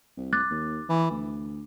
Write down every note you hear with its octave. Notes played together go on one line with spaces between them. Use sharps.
C2
D6 F#6 A6
D#2
E3
D2